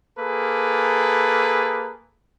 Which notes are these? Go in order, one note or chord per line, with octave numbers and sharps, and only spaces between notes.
A#3 G#4 A4 B4